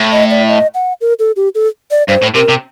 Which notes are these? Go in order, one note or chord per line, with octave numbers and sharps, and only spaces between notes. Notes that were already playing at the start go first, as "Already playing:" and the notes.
Already playing: A2
D#5
D5
D#5
F#5
A#4
A4
G4
A4
D5
G2 C5
A2
C3 A#4
C3